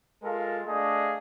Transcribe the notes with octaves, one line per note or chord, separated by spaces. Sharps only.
G#3 F4 A4 A#4 F5
A3 D4 G#4 D#5 F5